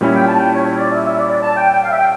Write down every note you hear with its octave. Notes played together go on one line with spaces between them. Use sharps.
A#2 G3 C#4 E4
G5
A5
G5
C#5
C#5
D5
E5
E5
D5
D5
A5
G5
G5
F5
E5
G5